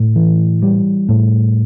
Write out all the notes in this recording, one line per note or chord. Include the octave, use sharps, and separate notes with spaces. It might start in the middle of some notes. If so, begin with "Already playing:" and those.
Already playing: A2
E3
G3
A2